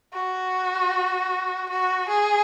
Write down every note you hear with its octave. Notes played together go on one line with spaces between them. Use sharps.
F#4
F#4
G#4